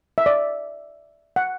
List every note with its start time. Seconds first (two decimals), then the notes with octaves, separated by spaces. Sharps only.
0.18 E5
0.26 D5
1.36 F#5